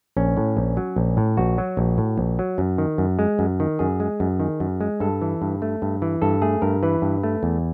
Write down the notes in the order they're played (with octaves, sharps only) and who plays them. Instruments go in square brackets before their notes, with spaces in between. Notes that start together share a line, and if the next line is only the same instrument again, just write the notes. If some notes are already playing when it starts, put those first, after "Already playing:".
[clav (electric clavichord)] A#1 C#4
A2
A#1
F#3
A#1
A2
A#1 F#4
F#3
A#1
A2
A#1
F#3
F#2
D#3
F#2
G#3
F#2
D#3
F#2 G#4
G#3
F#2
D#3
F#2
G#3
G2 A4
E3
G2
A3
G2
E3
G2 A4
A3 G#4
G2 A#4
E3 B4
G2
A3
E2